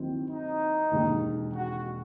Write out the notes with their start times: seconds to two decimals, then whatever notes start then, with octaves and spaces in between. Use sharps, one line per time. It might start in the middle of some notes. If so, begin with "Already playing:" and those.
Already playing: D#2 D#3 F#3 C4 E4
0.29 D#4
0.91 E1 D#2 D#3
1.54 F#4